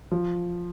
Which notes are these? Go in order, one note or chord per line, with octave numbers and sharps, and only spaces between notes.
F3